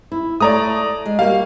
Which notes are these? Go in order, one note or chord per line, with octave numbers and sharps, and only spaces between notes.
E4
A3 A4 C#5 D5 A#5 D#6
G#3
G3 A#3 F#4 F5